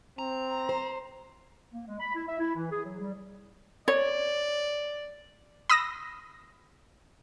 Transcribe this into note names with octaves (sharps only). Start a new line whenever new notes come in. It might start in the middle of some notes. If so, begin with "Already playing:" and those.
C4 A#5
C5
A#3
G#3
B5
E4
E5
E4
E3
G#4
F#3
G3
C#5 D5
B5 D#6 E6 A#6